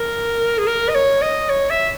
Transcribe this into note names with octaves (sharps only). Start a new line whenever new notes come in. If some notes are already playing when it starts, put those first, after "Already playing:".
Already playing: A#4
G#4
A#4
D#5
C#5
D#5
C#5
E5